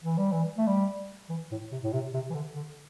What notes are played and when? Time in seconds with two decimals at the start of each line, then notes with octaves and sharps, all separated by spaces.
0.04 E3
0.18 G3
0.32 E3
0.58 A3
0.67 G3
1.29 E3
1.51 A2
1.72 C3
1.83 A2
1.93 C3
2.14 C3
2.30 E3
2.34 D3
2.56 D3